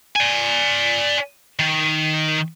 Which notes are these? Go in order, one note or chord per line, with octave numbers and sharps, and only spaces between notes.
D5 G#5
D#3